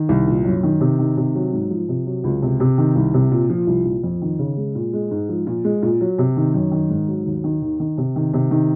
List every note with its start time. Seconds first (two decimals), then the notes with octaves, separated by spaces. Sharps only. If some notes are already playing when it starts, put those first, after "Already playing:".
Already playing: D#3
0.09 C2
0.27 A#2
0.45 F#2
0.63 D#3
0.81 C3
0.99 D#3
1.17 C3
1.35 F#3
1.53 G#2
1.71 F3
1.89 C3
2.06 F#3
2.24 C#2
2.42 C3
2.60 C3
2.78 D#3
2.96 C2
3.14 C3
3.31 A#2
3.50 F3
3.67 C2
3.85 A#2
4.04 F2
4.22 D#3
4.39 C#3
4.57 G#3
4.75 A#2
4.93 G#3
5.11 G#2
5.29 F3
5.47 A#2
5.64 G#3
5.82 A#2
6.01 F#3
6.18 C3
6.37 D#3
6.54 F#2
6.72 D#3
6.90 G#2
7.08 F#3
7.26 D#2
7.44 D#3
7.62 D#2
7.80 D#3
7.98 C3
8.16 D#3
8.33 C3
8.51 D#3